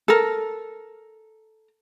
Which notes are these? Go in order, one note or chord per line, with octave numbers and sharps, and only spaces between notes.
A4 A#4